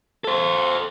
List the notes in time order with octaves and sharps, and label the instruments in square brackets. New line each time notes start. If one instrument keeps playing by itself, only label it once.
[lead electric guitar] A4 C5